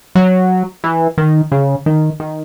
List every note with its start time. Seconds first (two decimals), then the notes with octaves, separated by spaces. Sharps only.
0.15 F#3
0.84 E3
1.18 D#3
1.52 C#3
1.86 D#3
2.20 D#3